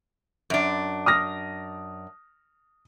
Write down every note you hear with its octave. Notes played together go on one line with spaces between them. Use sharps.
F#2 D4
D#6 F6 A#6